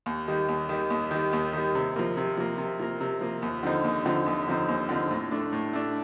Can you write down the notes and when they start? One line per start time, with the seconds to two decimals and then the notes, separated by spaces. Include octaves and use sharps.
0.06 D#2
0.28 D#3 G3
0.49 D#2
0.69 D#3 G3
0.90 D#2
1.11 D#3 G3
1.33 D#2
1.53 D#3 G3
1.75 C3
1.96 F3 A#3
2.17 C3
2.37 F3 A#3
2.58 C3
2.80 F3 A#3
3.01 C3
3.21 F3 A#3
3.42 D#2
3.63 D3 F3 C4 D#4
3.84 D#2
4.05 D3 F3 C4 D#4
4.26 D#2
4.47 D3 F3 C4 D#4
4.69 D#2
4.89 D3 F3 C4 D#4
5.11 A2
5.31 A3 D4
5.52 A2
5.73 A3 D4